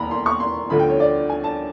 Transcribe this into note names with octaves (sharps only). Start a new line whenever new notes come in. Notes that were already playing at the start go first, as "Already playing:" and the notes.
Already playing: E1 D#2 A#5 B5
C6
C#6
C6
D2 D3 F3 B5
G5
C#5
D5
G#5
A5